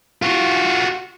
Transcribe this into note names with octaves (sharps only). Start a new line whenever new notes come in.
F4 F#4